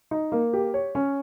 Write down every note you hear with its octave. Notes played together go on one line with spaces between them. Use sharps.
D#4
A#3
G4
C#5
C#4